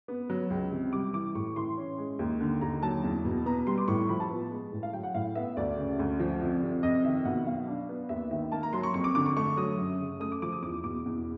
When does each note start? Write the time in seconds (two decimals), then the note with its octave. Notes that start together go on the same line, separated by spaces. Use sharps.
0.08 B3
0.30 F#3
0.50 C#2
0.72 C3
0.93 G3 D6
1.14 E3 D6
1.35 A2 C#6
1.56 E3 C6
1.78 C#4
1.98 G#3
2.19 D#2
2.40 D3
2.61 D#2 A#5
2.82 F#3 A5
3.04 E2
3.25 B2
3.46 B3 A#5
3.67 G3 C6
3.78 D6
3.88 A2 C#6
4.09 F3 B5
4.20 A5
4.30 B3
4.51 G#3
4.72 A2
4.83 F5
4.93 F#3 G5
5.03 F#5
5.15 A2 F5
5.35 B3 E5
5.57 D2 D5
5.78 C#3
5.99 D2
6.20 F3
6.41 F2
6.62 C3
6.83 F2 D#5
7.05 D#3 E5
7.25 B2 F#5
7.46 F#3 F5
7.68 D4
7.89 B3
8.09 D#2 E5
8.31 D#3 E5
8.52 A#3 A5
8.63 A#5
8.73 F#3 C6
8.83 C#6
8.94 F2 C#6
9.04 D6
9.15 D3 D6
9.26 C#6
9.36 A3 C#6
9.57 F#3 D#6
9.78 F#2
10.00 C#3
10.20 A3 D#6
10.32 D6
10.42 F3 D6
10.52 D#6
10.62 E2 D6
10.84 B2 D6
11.06 E2